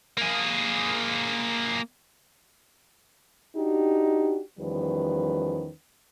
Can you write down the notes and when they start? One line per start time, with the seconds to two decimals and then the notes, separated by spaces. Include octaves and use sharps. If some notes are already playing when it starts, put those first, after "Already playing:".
0.17 A#3 G#4
3.55 D4 D#4 F#4 G4
4.59 E2 D#3 F3 G3 C#4 B4